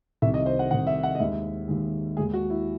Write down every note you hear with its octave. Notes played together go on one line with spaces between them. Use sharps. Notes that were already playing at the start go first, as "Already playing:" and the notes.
C2 C3 D#3 E5
D#5
C5
F#5
C2 C3 D#3 F#5
E5
F#5
D#5
D#2 D#3 G#3 E5
D#2 D#3 G#3
D#2 D#3 G#3 G#4
F#4
E4